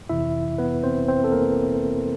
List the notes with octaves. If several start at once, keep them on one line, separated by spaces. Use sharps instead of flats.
F2 C3 E3 E4 E5
B3 B4
C4 C5
C4 C5
A4
A#3 A#4